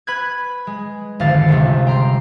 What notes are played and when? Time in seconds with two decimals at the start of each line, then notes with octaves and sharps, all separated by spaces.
0.07 B4 B5 F#6 G#6
0.67 G#3
1.20 G#1 F2 D3 F5 A6 C#7
1.48 G1 C#2 C3
1.87 G5 A#5 C6